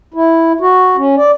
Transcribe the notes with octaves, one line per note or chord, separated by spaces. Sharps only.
E4
F#4
C#4
D5